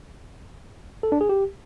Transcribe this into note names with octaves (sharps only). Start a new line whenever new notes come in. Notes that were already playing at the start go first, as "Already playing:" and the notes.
A4
D4
G#4
G4